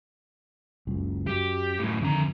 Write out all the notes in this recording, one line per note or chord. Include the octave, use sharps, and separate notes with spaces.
F#1 C#2
F#2 G4
F#2 A2
F2 D3 D#3 A#5